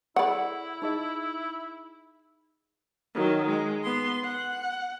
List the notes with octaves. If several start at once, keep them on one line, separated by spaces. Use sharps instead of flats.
E4 G#4 A4 D5 F#5 B5
D#4 G#4 D#5
D#3 F#3
G#3
B3 C6
F#5